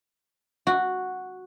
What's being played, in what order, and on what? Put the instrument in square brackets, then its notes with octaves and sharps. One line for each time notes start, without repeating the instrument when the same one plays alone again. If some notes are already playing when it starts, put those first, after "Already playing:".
[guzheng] F#4